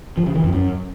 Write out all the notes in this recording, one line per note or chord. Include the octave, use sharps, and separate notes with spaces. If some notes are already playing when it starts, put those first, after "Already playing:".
F3
C#3
E3
F2
F#2